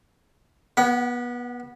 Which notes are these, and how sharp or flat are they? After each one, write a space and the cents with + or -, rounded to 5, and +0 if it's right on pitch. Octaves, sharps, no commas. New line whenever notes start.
B3 -25 F#5 +25